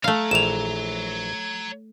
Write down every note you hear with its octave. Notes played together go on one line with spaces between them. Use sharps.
A3 C#5 F5 A#5
A#1 E3 G5 E7 F7